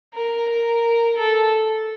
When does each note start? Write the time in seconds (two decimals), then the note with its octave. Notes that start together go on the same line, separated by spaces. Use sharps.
0.14 A#4
0.50 A#4
1.18 A4